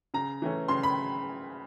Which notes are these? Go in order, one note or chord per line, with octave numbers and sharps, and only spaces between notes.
C#3 A#5
E3 A3 C#4
C#3 C6
B5